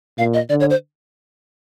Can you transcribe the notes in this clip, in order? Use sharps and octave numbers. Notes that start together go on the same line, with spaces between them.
A#2 F5
D#5
D3 D5
C#5
C5